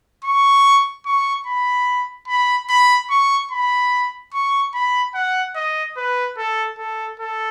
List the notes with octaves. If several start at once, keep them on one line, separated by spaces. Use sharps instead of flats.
C#6
C#6
B5
B5
B5
C#6
B5
C#6
B5
F#5
D#5
B4
A4
A4
A4